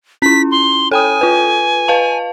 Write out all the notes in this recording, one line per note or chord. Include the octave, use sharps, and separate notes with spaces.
C#4 E4 B6
C6
A4 G5 G#5 D#6
F4 B4
B4 F5 A5